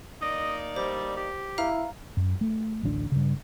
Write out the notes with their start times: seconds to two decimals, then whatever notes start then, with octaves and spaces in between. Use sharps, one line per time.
0.22 A#3 D#4 D5 D#5
0.76 G3 C5
1.17 G4
1.58 E4 F5 A#5 F6
2.17 F#2
2.41 A3
2.83 A1 D2 C4 D4
3.12 G2 C#3